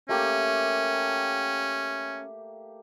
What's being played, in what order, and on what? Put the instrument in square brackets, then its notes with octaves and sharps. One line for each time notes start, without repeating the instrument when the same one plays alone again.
[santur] A3 A#3 G4 [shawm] C#4